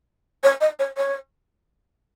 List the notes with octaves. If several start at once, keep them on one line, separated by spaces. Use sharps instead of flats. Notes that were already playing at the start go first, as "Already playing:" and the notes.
C#5
D#5
C#5
C#5